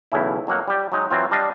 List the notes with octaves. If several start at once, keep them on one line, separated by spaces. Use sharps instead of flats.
B1 E2 A2 C#3 E4
F2 F#3 A#3 F#5
G3 G4
F#3 G#3 D#4
E3 F#3 C4 F4
G3 D4 D#5 F5